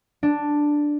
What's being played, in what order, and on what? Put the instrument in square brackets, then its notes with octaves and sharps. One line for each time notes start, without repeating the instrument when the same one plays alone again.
[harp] D4